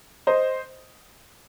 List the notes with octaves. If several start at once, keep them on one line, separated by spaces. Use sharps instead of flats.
C5 D#5